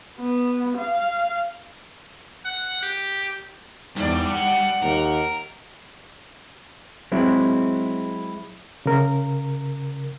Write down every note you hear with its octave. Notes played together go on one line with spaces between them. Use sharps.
B3
F5
F#5
G4
E2 G2 G3 D5
F#5
D#2 A#4
F#3 G#3 C4 E4
C#3 A#4